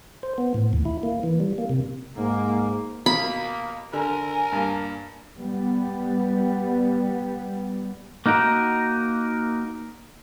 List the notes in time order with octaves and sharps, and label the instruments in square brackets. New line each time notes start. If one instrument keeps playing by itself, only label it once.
[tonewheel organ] C5
B3
A2
D#2
E4
A#3
E3
G3
A#3
C3
[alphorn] G#2 [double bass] A#3
[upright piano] B2 [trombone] A#3 [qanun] B5
[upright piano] D3 [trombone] A#4 [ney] G#5
[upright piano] G2 A#3
[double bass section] G3 B3
[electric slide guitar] A#3 D#4 F#4 A#4